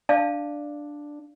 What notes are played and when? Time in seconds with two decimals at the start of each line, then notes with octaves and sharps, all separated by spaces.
0.09 D4 D5 F5 A5